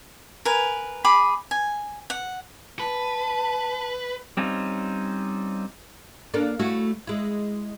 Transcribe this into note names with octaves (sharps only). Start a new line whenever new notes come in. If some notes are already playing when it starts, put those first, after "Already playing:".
A#4 B4 G#5
G#4 B5 D6
G#5
F#5
B4 A5
G3 C4 C#4 D#4 F4
A#3 D4 A4
A3 E4 F#4
G#3 E4